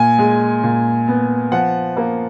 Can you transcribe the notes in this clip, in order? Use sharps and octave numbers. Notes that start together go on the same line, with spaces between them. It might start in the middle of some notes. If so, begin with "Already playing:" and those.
Already playing: A#2 G#5
G#3
A#2
B3
F3 F#5
A#3